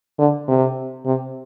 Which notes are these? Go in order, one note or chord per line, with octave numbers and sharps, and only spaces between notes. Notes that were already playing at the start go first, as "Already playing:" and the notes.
D3
C3
C3